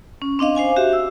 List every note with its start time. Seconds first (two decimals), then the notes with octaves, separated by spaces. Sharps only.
0.22 C#4
0.39 C4 D4 D#5 F5
0.55 C5 F5 G#5 D6
0.76 F#4 G4 E5
0.93 E6